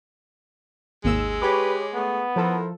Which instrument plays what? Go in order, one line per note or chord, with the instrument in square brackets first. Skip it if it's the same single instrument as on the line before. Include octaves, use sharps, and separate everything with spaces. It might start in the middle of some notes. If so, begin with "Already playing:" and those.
[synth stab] G#1 D#2 E6 [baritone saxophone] G#3
[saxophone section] G4 [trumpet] B4 [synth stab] C#5 B5 D6
[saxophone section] A3 G#4 [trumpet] B3
[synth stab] F3 A4 [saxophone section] E4 A#4 C5